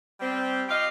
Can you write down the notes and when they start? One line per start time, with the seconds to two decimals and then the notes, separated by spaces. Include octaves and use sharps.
0.20 G3 C4
0.68 F4 G4 D#5 F5